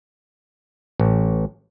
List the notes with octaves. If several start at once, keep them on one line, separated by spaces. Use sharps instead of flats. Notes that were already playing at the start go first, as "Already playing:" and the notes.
A1